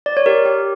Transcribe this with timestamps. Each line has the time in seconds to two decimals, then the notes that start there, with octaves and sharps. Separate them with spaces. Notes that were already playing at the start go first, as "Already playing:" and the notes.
0.06 D5
0.17 C#5
0.26 G4 A#4
0.46 G4